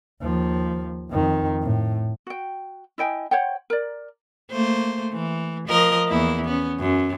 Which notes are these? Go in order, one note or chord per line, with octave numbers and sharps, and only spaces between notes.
D#2 F3
F2 D#3
A2
F#4 G5
E4 D#5 G5 G#5
C5 C#5 F#5 G5
A#4 D5
A3 A#3 C5
E3
F3 A#4 D#5
E2 A#3 E4
B3 C#4
F#2